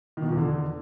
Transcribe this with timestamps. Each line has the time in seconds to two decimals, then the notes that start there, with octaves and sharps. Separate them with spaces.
0.17 D#3
0.22 B2
0.27 F3
0.32 E2
0.37 D3